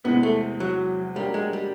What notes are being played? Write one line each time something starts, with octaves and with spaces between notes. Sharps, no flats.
E2 C3 E3 G#3 B3
A3
F#3
F#3 G3 A#3 D4 G4
G#3
G3